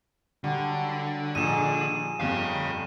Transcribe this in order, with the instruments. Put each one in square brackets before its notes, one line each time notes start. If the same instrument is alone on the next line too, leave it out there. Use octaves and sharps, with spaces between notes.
[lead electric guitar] D3 [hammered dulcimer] F#3 G3 D4
[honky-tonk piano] A#1 [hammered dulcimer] D#4 G#4 [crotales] D#7 E7
[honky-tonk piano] G1 F2 [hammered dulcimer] G3 [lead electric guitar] C#5 F5